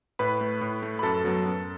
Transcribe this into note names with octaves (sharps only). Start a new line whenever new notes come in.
A2 B4 B5
A3
A2
A3
B5
F#2 A4 A5
F#3 B3
F#2